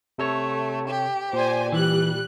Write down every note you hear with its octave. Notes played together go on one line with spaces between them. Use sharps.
C3 A3 A4 C#5
G4
A#2 C5 D5 G#5
E3 G3 F#6